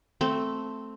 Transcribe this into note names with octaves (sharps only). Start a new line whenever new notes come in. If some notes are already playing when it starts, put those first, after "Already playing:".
A3 C4